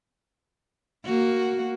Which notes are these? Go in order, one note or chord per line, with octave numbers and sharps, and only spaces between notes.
A#3 F#4